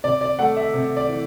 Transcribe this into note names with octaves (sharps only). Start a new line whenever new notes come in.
C3 D5
D5
A3 F#5
E5
C3
D5
E3